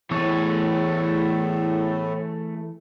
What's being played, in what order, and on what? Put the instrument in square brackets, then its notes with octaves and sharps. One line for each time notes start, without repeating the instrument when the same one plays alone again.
[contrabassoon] E2 [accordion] A2 [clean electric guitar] E3 A4 C#5 [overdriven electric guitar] A3 G#4